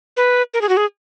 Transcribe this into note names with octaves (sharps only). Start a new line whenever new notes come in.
B4
A#4
G#4
F#4
G#4